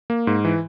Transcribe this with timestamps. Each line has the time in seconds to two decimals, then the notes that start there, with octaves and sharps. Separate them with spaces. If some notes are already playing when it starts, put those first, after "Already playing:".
0.10 A#3
0.27 G#2
0.45 E3